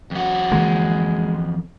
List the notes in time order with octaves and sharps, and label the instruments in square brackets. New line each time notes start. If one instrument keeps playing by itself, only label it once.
[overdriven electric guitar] F2 F#4
[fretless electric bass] D3 E3 A#3 [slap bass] G#3